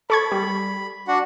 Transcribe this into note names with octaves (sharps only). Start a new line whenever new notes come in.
A4 B5 C#6 G#6
G3
D4 F#4 F#5